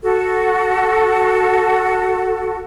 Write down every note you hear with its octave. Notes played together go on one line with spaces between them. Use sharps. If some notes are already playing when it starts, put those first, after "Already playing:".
F#4 A4